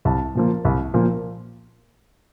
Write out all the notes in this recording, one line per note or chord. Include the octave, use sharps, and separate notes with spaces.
C2 A5
A#2 F3 A#3
C2
A#2 F3 A#3